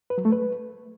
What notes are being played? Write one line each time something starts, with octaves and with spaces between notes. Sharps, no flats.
B4
F#3
A3
B4